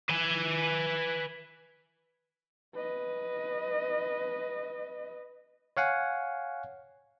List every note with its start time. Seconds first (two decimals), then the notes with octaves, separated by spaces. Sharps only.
0.09 B4 G#5
2.75 B4 D#5
5.77 C#5 F5 F#5 G#5